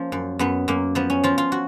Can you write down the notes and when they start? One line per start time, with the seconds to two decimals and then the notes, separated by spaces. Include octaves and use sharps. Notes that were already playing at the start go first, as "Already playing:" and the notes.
Already playing: F3 A#3 C#4
0.12 F#2
0.39 F#2 B3
0.68 F#2 A#3
0.95 F3 B3
1.10 C#4
1.24 F3 F4
1.38 F4
1.52 F#4